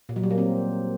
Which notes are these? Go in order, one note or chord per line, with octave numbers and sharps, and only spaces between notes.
A#2
F#3
G3
A#3
C4